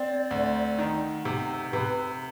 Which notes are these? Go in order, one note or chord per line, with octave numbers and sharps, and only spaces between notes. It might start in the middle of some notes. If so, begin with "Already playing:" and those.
Already playing: C4 D5
D2
D#3
C3
C3 B4